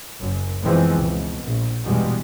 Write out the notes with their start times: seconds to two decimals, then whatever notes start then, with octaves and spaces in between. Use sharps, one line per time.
0.20 F#1 F#2
0.62 F#2 B2 E3 F3 G#3 C4
0.96 C#2 B2
1.42 A#1
1.83 E2 G2 B2 G3 G#3